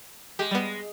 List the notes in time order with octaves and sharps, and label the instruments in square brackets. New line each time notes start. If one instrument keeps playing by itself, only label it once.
[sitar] G#3 [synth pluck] G4
[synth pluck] G3 B3